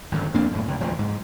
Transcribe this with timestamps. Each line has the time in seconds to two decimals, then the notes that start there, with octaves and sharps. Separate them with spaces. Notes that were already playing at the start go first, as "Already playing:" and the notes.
0.12 G#1 F#2 D3
0.34 F2 A#3 C4 D4
0.51 F#2 A2
0.68 C#2
0.80 E1 F3
0.99 G#2